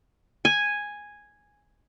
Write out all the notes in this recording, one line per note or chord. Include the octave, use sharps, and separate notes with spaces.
G#5